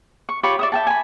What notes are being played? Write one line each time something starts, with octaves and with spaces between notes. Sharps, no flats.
C#6
F4 G4 C#5 B5
D5 E5 D#6
E5 G5 A5
G#5 B5